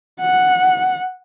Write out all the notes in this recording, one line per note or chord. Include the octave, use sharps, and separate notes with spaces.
F#5